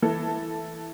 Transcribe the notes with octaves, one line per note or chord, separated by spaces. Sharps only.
E3 A4